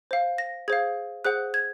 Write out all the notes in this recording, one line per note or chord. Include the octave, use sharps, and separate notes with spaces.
C5 F5
A#6
G#4 C5 F5 G#6
G#4 C5 F#5 F#6
G#6